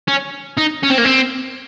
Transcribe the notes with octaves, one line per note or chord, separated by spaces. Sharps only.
C#4
D#4
C#4
C4
A#3
C4